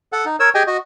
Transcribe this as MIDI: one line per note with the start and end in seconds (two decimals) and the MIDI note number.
0.13 0.25 69
0.13 0.25 78
0.25 0.36 63
0.40 0.49 70
0.40 0.49 73
0.40 0.49 88
0.55 0.63 67
0.55 0.63 68
0.55 0.63 75
0.55 0.63 79
0.55 0.63 80
0.67 0.77 66
0.67 0.77 75